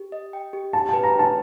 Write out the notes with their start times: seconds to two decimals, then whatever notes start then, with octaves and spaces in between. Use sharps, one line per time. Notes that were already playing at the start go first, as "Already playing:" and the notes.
Already playing: G4
0.12 D#5
0.33 G5
0.53 G4
0.73 G4 A5
0.89 B4 A5
1.03 A#5
1.14 G5
1.19 A5